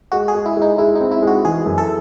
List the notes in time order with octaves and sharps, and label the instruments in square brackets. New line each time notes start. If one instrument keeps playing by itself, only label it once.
[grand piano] G#3 [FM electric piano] F#4
[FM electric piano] G#4
[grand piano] G#3
[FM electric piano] E4
[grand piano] G#3 [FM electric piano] D#4
[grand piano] G#3 [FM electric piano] E4
[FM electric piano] D#4
[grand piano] C4
[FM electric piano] E4
[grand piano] G#3 [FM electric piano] F#4
[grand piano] E3 [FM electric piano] G#4
[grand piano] F#2
[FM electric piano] A4